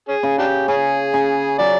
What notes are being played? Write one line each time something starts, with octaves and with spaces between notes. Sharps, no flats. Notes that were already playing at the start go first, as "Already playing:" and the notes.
C#4 G#4
C#3
D4 G4
C#3 C#4 G#4
C#3
F#3 D5